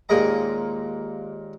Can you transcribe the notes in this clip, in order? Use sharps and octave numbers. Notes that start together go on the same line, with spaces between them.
D#2 A#2 G#3 A#4 D#5 A#5